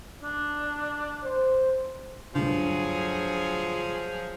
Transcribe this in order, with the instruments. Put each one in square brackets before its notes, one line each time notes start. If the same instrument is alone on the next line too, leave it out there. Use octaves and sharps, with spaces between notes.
[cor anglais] D4
[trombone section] C5
[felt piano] D2 G2 [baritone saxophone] F3 [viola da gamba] F#3 G#4